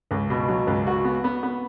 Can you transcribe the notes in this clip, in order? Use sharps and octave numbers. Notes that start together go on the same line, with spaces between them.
C#2
B2
F#3
C#2
F#4
B3
B3
B3